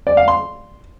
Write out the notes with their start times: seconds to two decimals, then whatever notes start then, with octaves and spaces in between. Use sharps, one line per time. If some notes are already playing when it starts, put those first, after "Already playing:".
0.07 D5
0.17 F5
0.28 C6